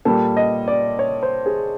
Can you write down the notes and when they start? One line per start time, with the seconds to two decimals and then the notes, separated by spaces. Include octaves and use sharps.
0.05 A#2 G3 A4
0.37 D#5
0.68 D5
0.99 C#5
1.23 C5
1.46 G#4